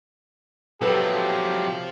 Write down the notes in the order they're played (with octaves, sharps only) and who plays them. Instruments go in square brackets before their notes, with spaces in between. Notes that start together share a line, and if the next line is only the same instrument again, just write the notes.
[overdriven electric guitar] C3 F#3 [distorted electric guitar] F3 F4 [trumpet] G4 [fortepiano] A4 B4